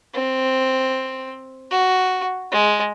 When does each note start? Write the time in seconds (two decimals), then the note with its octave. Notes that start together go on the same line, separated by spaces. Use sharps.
0.14 C4
1.71 F#4
2.52 G#3